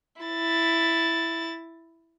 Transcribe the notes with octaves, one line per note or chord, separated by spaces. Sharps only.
E4 A6